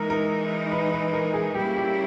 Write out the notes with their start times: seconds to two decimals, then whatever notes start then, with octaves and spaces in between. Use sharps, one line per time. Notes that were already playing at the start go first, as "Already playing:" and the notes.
Already playing: E3 G#3 D#4 A#4
0.10 A#4
0.72 B4
0.93 B4
1.13 A#4
1.34 G#4
1.54 C#3 G3 A#3 E4 G4
1.76 G4